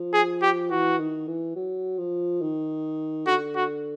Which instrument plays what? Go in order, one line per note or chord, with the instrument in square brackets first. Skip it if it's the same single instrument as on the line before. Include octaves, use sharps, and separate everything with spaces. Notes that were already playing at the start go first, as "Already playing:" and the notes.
Already playing: [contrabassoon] F3
[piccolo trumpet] G#4
G4
[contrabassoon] E3 [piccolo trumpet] F#4
[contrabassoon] D#3
E3
F#3
F3
D#3
[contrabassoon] D3 [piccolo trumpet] F#4
[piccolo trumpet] F#4